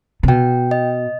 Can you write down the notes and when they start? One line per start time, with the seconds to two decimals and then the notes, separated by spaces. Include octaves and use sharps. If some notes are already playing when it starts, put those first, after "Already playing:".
0.23 C3
0.28 B2 G5
0.71 D#5